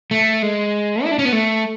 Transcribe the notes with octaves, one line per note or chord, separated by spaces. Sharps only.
A3
G#3
E4
D4
C#4
B3
A3